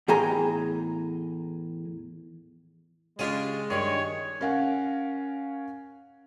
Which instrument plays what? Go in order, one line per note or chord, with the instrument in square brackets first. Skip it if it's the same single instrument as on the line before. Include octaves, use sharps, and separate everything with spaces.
[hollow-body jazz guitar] E2 A2 G#4 G5 G#5 A#5
[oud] C#3 C#4 G4 [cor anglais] G#3 [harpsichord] D4 F4 G#4
[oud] G2 D4 G4 [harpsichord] D#3 [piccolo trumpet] C#5
[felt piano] C#4 A#4 F5 F#5 G#5